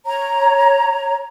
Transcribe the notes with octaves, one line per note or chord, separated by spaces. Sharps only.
C#5 A#5